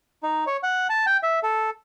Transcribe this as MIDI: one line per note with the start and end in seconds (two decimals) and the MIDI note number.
0.23 0.44 63
0.47 0.57 73
0.63 0.87 78
0.89 1.06 81
1.07 1.17 79
1.23 1.39 76
1.43 1.70 69